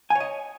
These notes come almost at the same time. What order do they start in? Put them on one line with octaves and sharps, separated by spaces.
G#5 C#5 D#5